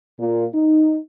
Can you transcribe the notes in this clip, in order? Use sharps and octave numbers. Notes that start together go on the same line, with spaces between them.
A#2
D#4